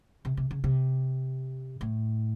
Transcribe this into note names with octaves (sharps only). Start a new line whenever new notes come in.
C3
C3
C#3
C3
A2